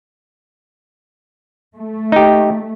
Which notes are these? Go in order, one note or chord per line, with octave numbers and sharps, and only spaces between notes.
A3
D#4 G4